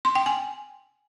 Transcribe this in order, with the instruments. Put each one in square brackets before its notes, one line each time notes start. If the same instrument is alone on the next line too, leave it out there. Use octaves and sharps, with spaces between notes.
[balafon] C6
G5
G#5